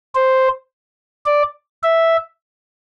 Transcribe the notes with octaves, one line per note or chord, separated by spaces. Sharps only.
C5
D5
E5